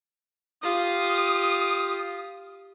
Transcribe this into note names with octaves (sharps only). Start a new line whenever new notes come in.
F4 G4 D#6